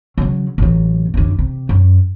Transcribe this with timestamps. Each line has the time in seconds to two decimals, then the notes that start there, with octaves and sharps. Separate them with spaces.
0.18 C#3 F#3
0.58 A1 F#3
1.14 F#2 D3
1.39 C3
1.69 F#2